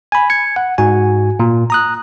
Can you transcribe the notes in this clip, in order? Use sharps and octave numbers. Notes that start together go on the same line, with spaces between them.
G#5 B5
G#6 C#7
F#5
G#2 F#4 G#5
A#2
A#5 D#6 F#6